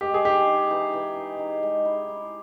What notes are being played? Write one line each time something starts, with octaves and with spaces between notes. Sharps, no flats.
G#3 G4
G#4
D#4 G4
D#4
E3
E3
D#4
D#4
G#3
E4
E4